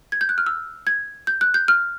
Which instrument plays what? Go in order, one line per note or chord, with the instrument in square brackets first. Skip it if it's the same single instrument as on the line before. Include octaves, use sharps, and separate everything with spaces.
[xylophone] G#6
G6
F#6
F6
E6
G#6
G6
F#6
G6
F6